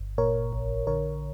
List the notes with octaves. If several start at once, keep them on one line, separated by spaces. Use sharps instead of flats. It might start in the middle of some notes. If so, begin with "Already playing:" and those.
Already playing: G1
A#2 A#4 C#5
A#1
D3 A#4 C#5